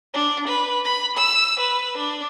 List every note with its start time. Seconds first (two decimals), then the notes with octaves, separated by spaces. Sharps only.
0.13 D4
0.47 B4
0.85 B5
1.17 E6
1.59 B4
1.97 D4